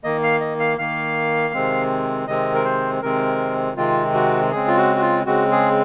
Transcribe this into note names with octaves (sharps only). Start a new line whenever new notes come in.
D#3 A#3 D#5
F5
D#5
F5
D#3 A#3 F5
C3 D#3 G#3 C4
C3 D#3 G#3 C4 D#5
A#4
C5
C3 D#3 G#3 C4 A#4
C3 D#3 G#3 C4 F4
F#4
C#3 G#3 C4 G#4
F4
F#4
F#4
F4
C#3 G#3 C4 F#4
G#4